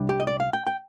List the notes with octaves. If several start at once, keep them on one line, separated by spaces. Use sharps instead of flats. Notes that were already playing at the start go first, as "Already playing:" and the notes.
Already playing: C2 G3 D4
G4
D#5
D5
F5
G5
G5